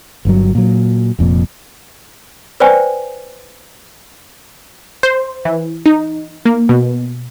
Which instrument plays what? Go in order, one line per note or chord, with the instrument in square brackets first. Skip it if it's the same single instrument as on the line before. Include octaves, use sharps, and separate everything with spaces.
[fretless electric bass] G1 G2 F#3
A#2 F#3
F1 F2 A#2
[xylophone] B4 C5 D5 G5 G#5
[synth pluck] C5
E3
D#4
A#3
B2